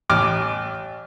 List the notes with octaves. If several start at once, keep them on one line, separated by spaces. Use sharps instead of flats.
A1 D6 F6